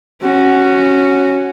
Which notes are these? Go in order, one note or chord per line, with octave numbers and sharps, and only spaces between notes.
C#4 F#4